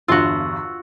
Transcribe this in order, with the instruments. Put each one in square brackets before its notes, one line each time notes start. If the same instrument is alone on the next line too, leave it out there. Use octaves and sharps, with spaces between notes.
[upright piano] G1 E2 G2 [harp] F4 F#4 [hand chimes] E6